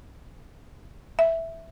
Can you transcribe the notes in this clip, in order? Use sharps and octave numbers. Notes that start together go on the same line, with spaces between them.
E5